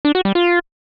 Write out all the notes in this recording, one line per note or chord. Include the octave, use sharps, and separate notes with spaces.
D4
F#4
G3
F4